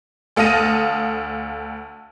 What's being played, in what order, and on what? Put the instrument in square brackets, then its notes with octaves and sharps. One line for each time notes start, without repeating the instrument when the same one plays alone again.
[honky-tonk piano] D2 A4 F5 D#6 A#6 D#7